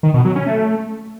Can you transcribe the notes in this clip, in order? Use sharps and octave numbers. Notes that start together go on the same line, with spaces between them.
D#3
B2
F#3
C#4
A3